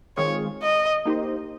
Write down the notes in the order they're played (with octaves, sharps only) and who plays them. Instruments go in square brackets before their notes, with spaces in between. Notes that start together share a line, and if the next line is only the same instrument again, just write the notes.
[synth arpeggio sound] D#3 G#3 C4 F4 G#4 [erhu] C#5
[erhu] D#5
[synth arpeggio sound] A#3 D#4 G4 C5